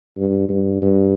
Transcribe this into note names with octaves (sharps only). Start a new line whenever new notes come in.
G2
G2
G2